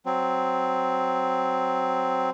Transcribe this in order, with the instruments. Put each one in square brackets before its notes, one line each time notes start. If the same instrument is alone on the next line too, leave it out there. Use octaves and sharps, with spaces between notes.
[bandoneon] F#3 C4